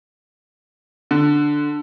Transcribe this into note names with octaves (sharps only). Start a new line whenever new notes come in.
D3